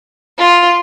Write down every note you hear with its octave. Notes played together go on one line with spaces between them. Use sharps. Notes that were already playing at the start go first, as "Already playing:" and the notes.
F4